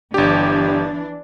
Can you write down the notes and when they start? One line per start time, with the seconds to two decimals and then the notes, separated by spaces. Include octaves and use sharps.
0.14 G1 E3 D4 G4